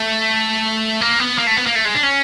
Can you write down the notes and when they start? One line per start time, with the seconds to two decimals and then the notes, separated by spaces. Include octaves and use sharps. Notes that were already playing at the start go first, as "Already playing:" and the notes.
Already playing: A3
1.01 A#3
1.20 B3
1.38 A#3
1.47 A3
1.57 B3
1.67 A#3
1.75 A3
1.85 G#3
1.94 D4
2.03 C#4